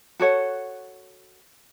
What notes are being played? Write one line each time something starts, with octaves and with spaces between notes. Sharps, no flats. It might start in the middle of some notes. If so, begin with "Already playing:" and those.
F#4 A4 C#5 F#5